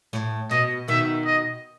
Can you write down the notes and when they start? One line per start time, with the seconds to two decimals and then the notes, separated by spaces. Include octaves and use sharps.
0.13 A2
0.51 B2 D#5
0.88 B2 D#3 E5
1.25 D#5